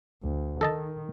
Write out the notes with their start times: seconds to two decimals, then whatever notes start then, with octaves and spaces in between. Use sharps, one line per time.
0.23 D2
0.61 D#3 A4 D#5 A5